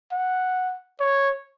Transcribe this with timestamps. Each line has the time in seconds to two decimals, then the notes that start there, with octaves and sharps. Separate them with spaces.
0.12 F#5
1.00 C#5